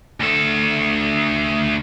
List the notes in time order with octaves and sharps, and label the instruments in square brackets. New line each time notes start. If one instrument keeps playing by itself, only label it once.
[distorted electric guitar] D2 A4